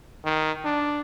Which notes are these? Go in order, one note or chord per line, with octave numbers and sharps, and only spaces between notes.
D#3
D4